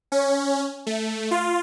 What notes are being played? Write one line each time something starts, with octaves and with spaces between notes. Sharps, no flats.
C#4
A3
F4